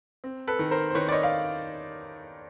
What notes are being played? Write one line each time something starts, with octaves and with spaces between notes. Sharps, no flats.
C4
A4 B4
D#3
A#4 C5
C5
D#3 B4 C#5
D5
C#5 D#5
F5